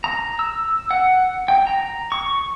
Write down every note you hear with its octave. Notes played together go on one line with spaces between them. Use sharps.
A#5
E6
F#5
G5
A#5
C#6